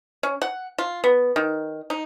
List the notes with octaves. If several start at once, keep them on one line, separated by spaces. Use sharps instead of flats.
C#4
F#5
F4
B3
D#3
D#4